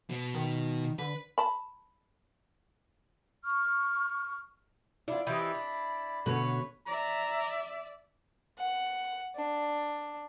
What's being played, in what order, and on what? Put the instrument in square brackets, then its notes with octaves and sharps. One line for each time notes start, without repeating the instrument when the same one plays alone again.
[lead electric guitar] B2 B3
[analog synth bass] D#3
[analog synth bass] D3 [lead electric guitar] B4
[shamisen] A5 B5
[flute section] C#6 F6
[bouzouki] D4 [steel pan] E4 F4
[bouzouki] E3 C4 G4 [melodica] E4 D5 B5 [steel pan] D#5 G5
[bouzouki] D4
[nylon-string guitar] B2 D3 A3 [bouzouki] F#4 B4 C#5
[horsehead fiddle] D5 E5 [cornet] A#5
[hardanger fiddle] F#5
D4